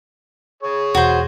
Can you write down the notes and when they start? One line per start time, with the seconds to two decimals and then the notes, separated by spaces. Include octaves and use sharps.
0.63 G#4 C#5
0.95 E1 F#4 C5